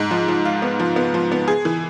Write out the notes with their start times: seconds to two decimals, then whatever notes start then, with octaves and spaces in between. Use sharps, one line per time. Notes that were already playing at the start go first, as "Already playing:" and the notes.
Already playing: G#2
0.11 F3
0.28 F3
0.45 F4
0.62 B3
0.79 F3
0.96 B3
1.14 F3
1.32 B3
1.48 G#4
1.65 E3